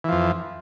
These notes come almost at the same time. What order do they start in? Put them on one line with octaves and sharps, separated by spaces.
E3 F3 F2